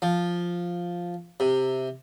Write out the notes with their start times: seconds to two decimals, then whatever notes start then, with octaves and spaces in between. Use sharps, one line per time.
0.02 F3
1.40 C3